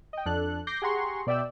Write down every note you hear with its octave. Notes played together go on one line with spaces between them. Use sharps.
D#5 G5
F2 D4 A4 F#6
D6 G6 A#6 C7
G4 G#4 F#5 A#5 C6 C#6
B2 D5 E5 G5 E6